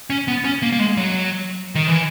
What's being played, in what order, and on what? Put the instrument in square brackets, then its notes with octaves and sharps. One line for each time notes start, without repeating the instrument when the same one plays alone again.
[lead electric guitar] C#4
B3
C#4
A#3
A#3
G#3
F#3
D#3
E3